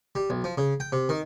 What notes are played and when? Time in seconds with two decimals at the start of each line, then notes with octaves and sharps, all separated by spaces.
0.15 G3
0.30 B1
0.44 F3
0.58 C#3
0.80 G5
0.92 C3
1.09 D#3